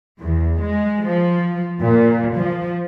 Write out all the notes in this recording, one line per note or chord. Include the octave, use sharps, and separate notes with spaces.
E2
G#3
F3
A#2
F3